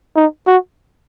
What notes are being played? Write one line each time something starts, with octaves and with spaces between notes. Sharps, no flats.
D#4
F#4